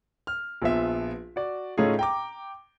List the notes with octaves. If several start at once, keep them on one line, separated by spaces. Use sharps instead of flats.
F6
A#1 F3 B3 E5
F#4 D5
A2 A3 C#4 D#4 F4 G#4
G5 A#5 D6